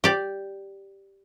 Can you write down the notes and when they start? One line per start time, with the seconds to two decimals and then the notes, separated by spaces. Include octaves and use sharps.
0.04 G4 D5